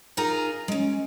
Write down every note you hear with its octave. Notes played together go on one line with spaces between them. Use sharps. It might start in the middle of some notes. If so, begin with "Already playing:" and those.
D#4 F4 G#4 A#4 A#5
G#3 C#4